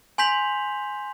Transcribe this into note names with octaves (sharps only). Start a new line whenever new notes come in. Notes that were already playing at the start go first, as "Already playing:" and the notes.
G#5 C6 G6 B6 F7 F#7